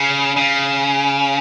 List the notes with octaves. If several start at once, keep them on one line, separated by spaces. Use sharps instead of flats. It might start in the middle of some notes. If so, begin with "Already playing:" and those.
Already playing: C#3
C#3